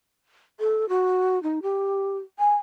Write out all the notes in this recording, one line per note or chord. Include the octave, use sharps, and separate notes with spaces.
A4
F#4
D#4
G4
G#5